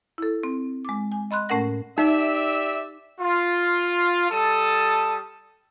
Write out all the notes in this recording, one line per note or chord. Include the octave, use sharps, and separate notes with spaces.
E4 A4
C4
G#3 D6
G#5
D#5 B5 C6 F#6
A2 A3 C#4 A#4 F#5 A#6
D#4 G4 D5 E5
F4
G3 A4 A5 D#6